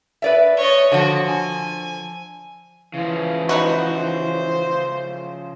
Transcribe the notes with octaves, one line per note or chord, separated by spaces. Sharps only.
B4 D5 E5
C#5 D#5
D3 F3 F#4
G#5
C#3 E3 F3
B3 D#4 F#4 C5